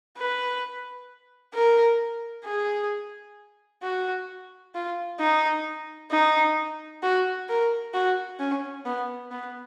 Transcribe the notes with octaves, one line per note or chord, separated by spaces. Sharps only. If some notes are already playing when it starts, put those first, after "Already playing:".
B4
A#4
G#4
F#4
F4
D#4
D#4
F#4
A#4
F#4
C#4
B3
B3